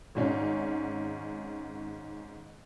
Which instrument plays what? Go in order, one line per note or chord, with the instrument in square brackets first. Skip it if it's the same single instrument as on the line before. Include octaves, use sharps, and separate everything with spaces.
[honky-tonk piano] G#1 G#2 C#4